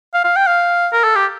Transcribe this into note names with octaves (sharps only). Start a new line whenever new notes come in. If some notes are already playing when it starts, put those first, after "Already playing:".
F5
F5
G5
F5
A#4
A4
G4